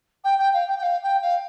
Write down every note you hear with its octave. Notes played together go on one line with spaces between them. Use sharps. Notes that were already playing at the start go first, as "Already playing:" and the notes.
G5
G5
F5
G5
G5
F5
G5
F5